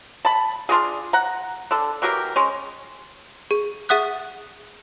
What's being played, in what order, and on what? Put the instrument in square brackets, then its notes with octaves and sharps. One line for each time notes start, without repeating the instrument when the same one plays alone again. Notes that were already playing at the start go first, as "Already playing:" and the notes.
[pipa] A5 B5
D4 F4 F#4 G#4
F#5 A#5
D3 A4
E3 F#3 G4 A#4
G#3 C#4
[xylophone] G#4
G#4 E5 F#5 D#6 F#6